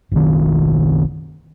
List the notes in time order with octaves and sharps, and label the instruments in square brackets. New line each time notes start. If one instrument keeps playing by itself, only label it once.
[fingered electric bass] F#1 B1 D#3